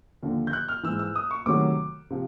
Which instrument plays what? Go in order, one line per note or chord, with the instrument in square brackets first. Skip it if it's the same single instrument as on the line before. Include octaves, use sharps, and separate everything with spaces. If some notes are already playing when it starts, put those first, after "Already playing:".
[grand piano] D#2 D3 F3
G6
F#6
F6
E3 E6
G#2
E6
D#6
C#6
D2 C3 D#3 F#3 D6
C3 F3